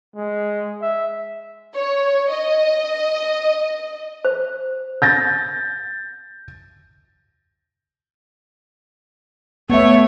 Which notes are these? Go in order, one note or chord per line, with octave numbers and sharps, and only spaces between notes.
G#3
E5
C#5
D#5
C5
G6 A6 A#6
A3 B3 C#5 E5